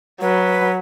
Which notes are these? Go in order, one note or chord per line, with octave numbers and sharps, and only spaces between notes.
F#3 B4